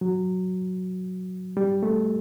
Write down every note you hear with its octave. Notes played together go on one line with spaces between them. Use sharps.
F#3
G3
A3